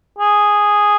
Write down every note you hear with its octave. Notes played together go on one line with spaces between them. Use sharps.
G#4